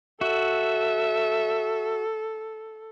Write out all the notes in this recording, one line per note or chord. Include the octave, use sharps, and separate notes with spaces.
F#4 A4 E5